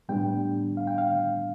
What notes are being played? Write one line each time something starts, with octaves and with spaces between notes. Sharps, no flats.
A2 G3 B3 D4 G5
F5
G5
F5